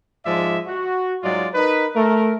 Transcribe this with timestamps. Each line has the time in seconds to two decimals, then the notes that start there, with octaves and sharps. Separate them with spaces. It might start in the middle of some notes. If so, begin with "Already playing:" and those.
0.24 G#2 F3 G#3 D5 E5
0.67 F#4
1.22 G#2 F#3 G#3 F4 D5
1.53 D#4 A#4 B4
1.94 A3 A#4